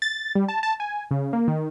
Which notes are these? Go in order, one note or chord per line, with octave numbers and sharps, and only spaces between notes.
A6
G3
A5
A5
G#5
C#3
A#3
D#3